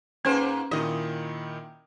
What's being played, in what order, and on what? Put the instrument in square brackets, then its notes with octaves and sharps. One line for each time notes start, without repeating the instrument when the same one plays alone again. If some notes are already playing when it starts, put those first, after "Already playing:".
[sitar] G#2 A#3 C5 [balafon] C#4 B4
[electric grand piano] A#2 D#3 E4 [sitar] D#5